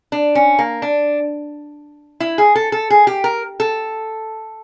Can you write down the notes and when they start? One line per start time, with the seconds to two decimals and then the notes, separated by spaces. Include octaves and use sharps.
0.12 D4
0.35 C#4
0.59 A#3
0.82 D4
2.20 E4
2.38 G#4
2.55 A4
2.72 A4
2.90 G#4
3.07 G4
3.24 A#4
3.60 A4